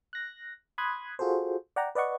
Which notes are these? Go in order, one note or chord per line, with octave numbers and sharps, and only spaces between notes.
F#6 A#6
B5 C6 D#6 F#6 G#6
F4 F#4 G#4 A4 C5
D5 F#5 G5 A#5
B4 D5 D#5 F#5 C#6